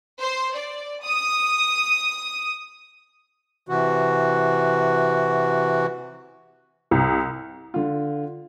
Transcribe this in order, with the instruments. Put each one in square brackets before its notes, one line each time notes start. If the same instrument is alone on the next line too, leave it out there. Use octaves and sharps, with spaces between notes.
[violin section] C5
D5
D#6
[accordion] C3 E3 F#4
[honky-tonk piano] C2
[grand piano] D3 F4